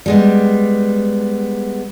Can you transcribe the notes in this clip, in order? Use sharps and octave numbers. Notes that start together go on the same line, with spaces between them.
G3 G#3 B3